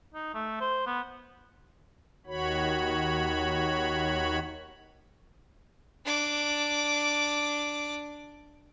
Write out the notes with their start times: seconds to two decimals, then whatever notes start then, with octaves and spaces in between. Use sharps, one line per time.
0.14 D#4
0.34 A3
0.61 C5
0.87 B3
2.27 D#2 D#3 F#4 C#5 B5
6.05 D4 D6